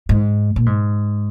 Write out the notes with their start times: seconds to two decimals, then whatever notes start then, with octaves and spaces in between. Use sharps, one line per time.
0.09 G#2
0.56 A#2
0.66 G#2